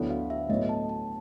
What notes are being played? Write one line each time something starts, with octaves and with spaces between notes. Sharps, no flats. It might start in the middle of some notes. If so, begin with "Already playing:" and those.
Already playing: D2 D3 F#3 B3 E4
F5
E5
A2 F#3 B3 D#5
A5
A5